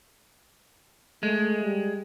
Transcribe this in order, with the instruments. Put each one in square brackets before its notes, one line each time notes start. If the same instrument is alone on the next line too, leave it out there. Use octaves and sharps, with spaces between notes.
[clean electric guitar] G#3 [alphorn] A3
[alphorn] G3